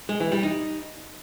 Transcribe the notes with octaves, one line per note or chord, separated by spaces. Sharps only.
G#3
E3
G3
D#4